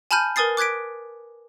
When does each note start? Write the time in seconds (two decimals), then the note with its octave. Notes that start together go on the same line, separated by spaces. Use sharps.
0.11 G#5 A5 B5 F6 G6 D#7
0.36 A#4 B4 G#5 D#6 A6 C7
0.57 D6 F#6 G#6 B6 D7